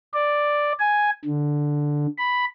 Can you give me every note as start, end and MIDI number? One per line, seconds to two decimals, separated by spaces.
0.13 0.72 74
0.79 1.10 80
1.25 2.07 50
2.18 2.45 83